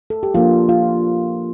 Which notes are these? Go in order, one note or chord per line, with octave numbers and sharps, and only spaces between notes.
A4
G4
F3 A#3 D4 F4
F4